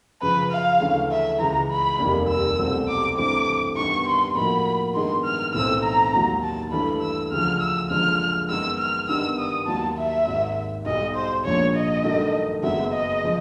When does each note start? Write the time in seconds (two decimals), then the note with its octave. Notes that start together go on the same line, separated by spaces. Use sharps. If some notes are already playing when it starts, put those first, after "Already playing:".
0.22 F#2 C#3 F3 B4
0.52 F5
0.80 D2 C#3 E3 A3 C#4
1.11 E5
1.40 C#2 C#3 E3 A#5
1.69 B5
1.99 F1 D#2 D#3 G3 A#3
2.29 E6
2.58 C2 B2 F#3 A3 C4
2.88 D6
3.17 G2 E3 A3 C4 D6
3.76 G2 D#3 G3 B3 C#6
4.06 C6
4.36 A2 F3 A#3 D#4 F#4 B5
4.94 G2 D#3 G#3 B3 C6
5.24 F6
5.54 B1 A2 E3 A3 C4 E6
5.83 A#5
6.13 D#2 D#3 F#3
6.42 A5
6.72 G2 E3 A3 B5
7.02 E6
7.31 D2 C#3 F3 F6
7.61 E6
7.90 F#1 F#2 D3 F3 G#3 F6
8.49 F#2 D#3 G#3 B3 E6
8.79 F6
9.08 G1 G2 D#3 G3 B3 E6
9.38 D#6
9.67 D#2 D#3 F#3 A5
9.97 E5
10.27 G#1 G#2 D#3
10.85 B1 B2 G3 D#5
11.15 C5
11.45 A#1 A#2 F3 C#5
11.75 D#5
12.04 G2 D#3 F#3 A3
12.63 F#1 F#2 C#3 F#3 B3 E5
12.93 D#5
13.24 C#3 F3